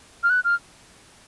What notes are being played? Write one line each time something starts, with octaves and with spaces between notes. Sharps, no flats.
F6
F#6
F6